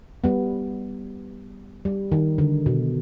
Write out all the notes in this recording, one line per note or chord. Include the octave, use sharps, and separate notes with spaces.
G3 B3
G3
D#3
D3
B2